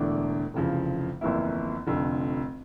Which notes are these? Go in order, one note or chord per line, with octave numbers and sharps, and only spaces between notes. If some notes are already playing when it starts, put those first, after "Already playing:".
Already playing: E1 E2 D3 A3 D4
F1 E2 C#3 F3
G1 F2 E3 A#3 E4
F1 F2 D3